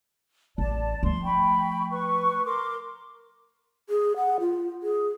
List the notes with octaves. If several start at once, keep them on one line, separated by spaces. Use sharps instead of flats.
A1 D5 A5
F3 A3 C6
G5 B5 C#6
B4 C#6
A#4 C6 D6
G#4
F#5
F4
G#4